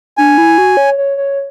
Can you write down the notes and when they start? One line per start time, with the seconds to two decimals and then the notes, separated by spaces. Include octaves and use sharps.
0.18 D4 G#5
0.38 E4
0.58 F#4
0.77 C#5
0.98 C#5
1.17 C#5